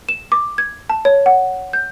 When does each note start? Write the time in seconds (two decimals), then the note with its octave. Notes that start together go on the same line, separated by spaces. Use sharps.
0.09 E7
0.32 D6
0.58 G#6
0.90 A5
1.05 C#5
1.26 F#5
1.73 G6